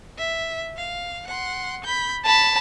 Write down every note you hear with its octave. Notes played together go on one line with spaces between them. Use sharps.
E5
F5
F#5 C6
B5 G6
A5 B5